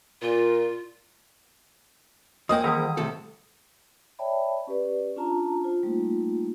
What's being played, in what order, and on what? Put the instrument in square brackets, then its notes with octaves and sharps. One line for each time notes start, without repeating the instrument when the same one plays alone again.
[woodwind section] A#2 [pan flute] F4
[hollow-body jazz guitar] F3 A#3 C#4 [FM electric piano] D#5 G5 [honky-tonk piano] D#6
[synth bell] D#3 E3 G3
[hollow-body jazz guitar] A2 C3 A4
[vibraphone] C#5 D5 E5 G5 A5 B5
C#4 G4 B4 D5
C#4 D4 F4 A5 A#5
F4 C5
G3 A3 A#3 D#4 F4